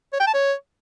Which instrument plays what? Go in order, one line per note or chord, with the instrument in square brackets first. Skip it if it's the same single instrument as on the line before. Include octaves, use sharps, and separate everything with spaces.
[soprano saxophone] C#5
G5
A5
C#5